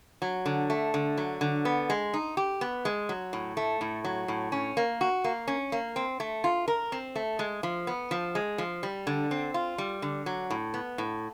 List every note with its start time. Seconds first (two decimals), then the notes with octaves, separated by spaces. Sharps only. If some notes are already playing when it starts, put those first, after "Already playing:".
0.22 F#3
0.46 D3
0.70 A3
0.94 D3
1.17 F#3
1.41 D3
1.65 B3
1.90 G#3
2.14 D#4
2.37 G4
2.61 B3
2.85 G#3
3.09 F#3
3.33 A2
3.57 A3
3.81 A2
4.05 F#3
4.28 A2
4.52 C#4
4.77 A#3
5.01 F#4
5.24 A#3
5.48 C#4
5.72 A#3
5.96 C4
6.20 A3
6.44 F4
6.68 A#4
6.92 C4
7.15 A3
7.39 G#3
7.63 F3
7.87 B3
8.11 F3
8.35 G#3
8.58 F3
8.83 G3
9.07 D3
9.31 C4
9.54 F4
9.78 G3
10.02 D3
10.26 F#3
10.50 A2
10.74 B3
10.98 A2